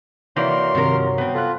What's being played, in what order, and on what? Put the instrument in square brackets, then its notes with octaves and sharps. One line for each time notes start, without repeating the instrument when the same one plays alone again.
[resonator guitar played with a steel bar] C3 E3 A#3 [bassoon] F#3 [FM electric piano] D5 D6 G6 [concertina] C6
[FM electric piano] G2 C3 [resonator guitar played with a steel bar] D#3 F3 A#4
[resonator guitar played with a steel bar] B3 C4
[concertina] F4 [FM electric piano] A4 F#6